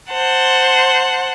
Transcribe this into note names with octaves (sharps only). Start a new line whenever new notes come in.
C5 F#5 A5